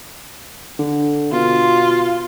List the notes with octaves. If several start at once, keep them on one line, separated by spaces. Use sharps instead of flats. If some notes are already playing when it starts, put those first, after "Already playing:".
D3
B2 F4